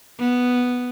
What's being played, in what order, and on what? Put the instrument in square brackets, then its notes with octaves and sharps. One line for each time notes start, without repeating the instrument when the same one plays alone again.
[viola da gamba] B3